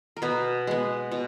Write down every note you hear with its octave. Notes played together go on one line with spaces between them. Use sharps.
A#4
B2 B3 B4
G#3 B3
B2